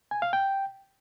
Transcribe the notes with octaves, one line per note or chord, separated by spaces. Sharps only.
G#5
F5
G5